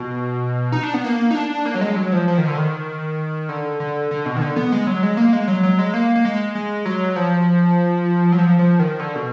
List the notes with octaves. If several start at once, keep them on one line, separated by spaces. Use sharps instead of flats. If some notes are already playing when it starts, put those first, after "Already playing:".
Already playing: B2
D#4
D4
B3
A#3
D#4
D4
A#3
F#3
G#3
F#3
F3
F3
D#3
D3
D#3
D3
D3
D3
B2
D#3
D3
B3
G#3
F#3
G#3
A#3
G#3
F#3
F#3
G#3
A#3
A#3
G#3
G#3
F#3
F3
F#3
F3
F3
D#3
D3
B2